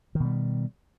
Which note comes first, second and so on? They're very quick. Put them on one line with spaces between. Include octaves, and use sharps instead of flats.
D#3 B2 G3